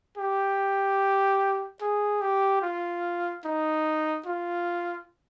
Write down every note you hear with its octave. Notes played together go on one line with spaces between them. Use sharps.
G4
G#4
G4
F4
D#4
F4